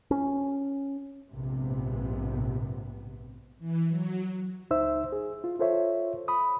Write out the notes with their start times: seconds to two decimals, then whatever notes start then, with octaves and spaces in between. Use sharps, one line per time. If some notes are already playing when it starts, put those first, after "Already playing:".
0.11 C#4
1.31 A#1 G#2 C3 B3
3.59 E3
3.88 F#3
4.71 C#2 D#4 C5 E5 E6
5.12 G#4
5.44 F4
5.59 F4 A4 C5 C#5 E5
6.28 B5 D#6